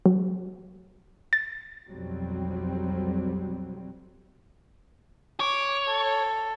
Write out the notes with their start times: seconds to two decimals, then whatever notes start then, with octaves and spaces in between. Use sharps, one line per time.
0.06 F#3
1.33 A6
1.90 B1 F2 F#3 G3 C4
5.40 C#5 D6
5.87 A4